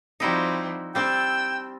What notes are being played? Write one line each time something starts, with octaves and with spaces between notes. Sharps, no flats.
F3 G3 C4 D#4 E4 F#4
G3 C4 D4 G5 E6